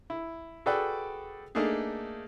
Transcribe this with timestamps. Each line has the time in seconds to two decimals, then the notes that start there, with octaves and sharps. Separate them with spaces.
0.10 E4
0.66 F#4 G#4 A4 B4 D5 G5
1.55 A3 A#3 D4 D#4 G#4